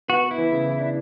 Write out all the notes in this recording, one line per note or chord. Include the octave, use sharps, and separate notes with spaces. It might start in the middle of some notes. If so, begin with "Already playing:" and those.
B3 F#4
B3
E4
E3
C#3
E3
D4